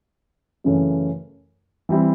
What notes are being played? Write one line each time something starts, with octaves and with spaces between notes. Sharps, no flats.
F#2 C#3 E3 A3 C#4
E3 G3 C4 E4